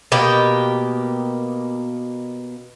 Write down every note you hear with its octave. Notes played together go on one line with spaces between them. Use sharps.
B2 A#3 G4